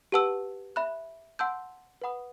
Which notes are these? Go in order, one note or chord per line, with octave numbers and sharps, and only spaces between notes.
G4 B4 F#5 A5 E6
E5 B5 F#6
F#5 A5 C6 E6 G6
B4 F#5 B5 D#6